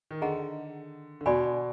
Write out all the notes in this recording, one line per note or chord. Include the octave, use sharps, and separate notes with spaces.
D#3
D3 G#4 D#5 F#5 A#5
D3
B2 F#4 D5 G#5 B5